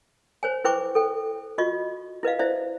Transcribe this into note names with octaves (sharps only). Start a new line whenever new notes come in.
C5 C#5 G#5
E4 B4 C5 G5 C#6 D6
A4 G5
F4 F#4 D#5 C#6
E4 B4 D#5 F5
E4 C5 D5 E5